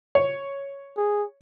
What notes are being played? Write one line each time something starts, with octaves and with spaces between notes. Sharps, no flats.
C#5
G#4